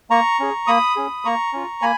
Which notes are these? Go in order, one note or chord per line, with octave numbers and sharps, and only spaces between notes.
A#3 A#5 C#6
C#4 G#4
A#3 B5 D#6
C#4 G#4
A#3 A#5 C#6
C#4 F4
A#3 G#5 B5